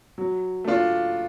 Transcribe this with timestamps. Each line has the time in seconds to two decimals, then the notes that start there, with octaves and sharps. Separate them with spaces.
0.18 F#3
0.65 A3 D4 F4